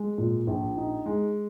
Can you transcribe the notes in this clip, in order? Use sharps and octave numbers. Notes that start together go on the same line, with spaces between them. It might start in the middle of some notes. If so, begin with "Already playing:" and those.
Already playing: G#3
A#2
A#1
D#4
G#3